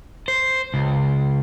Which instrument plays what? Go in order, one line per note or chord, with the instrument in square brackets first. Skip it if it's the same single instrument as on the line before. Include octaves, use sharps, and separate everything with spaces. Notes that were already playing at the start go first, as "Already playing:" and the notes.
[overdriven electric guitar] C5
C#2